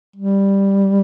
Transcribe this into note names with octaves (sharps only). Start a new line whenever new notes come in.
G3